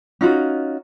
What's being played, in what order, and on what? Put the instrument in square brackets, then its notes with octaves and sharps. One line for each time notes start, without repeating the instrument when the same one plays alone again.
[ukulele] C#4 D#4 F4 F#4